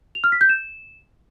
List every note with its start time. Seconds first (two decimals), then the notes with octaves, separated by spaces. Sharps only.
0.15 F7
0.24 F6
0.32 B6
0.41 G6
0.49 E7